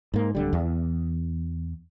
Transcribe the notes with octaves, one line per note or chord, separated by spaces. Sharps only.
G#2 A#3
D1 D3 G3
E2